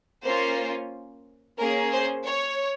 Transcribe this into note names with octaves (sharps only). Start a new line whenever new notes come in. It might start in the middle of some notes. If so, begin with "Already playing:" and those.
A#3 C#4 F4 C5
A#3 C#4 G#4 A#4
C5
C#5